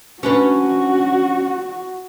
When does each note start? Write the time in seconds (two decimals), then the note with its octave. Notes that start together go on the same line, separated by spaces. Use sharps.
0.23 C#4 D4 F#4 B4